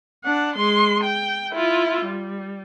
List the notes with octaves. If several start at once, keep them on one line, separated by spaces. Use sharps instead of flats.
D4 F#5
G#3 C6
G5
E4 F4
G3